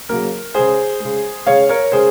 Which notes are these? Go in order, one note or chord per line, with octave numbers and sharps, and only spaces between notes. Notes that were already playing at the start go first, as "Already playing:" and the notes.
C#3 F#3 A#3 A#4
C#3 G#3 G#4 C5
C#3 G#3
C#3 G#3 C#5 F5
A#4 C#5
C#3 G#3 G#4 C5